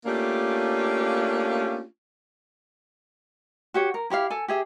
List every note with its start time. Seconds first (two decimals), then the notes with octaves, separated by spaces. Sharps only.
0.06 A3 A#3 C#4 D4 F4 G4
3.74 F#4 G4 C#5
3.94 A#4
4.10 E4 G4 C#5 F5
4.30 A4 G#5
4.48 G4 G#4 E5